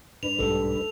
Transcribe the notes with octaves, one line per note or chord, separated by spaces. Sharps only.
G2 D4 B4 F7
B1 G#2 G3 A4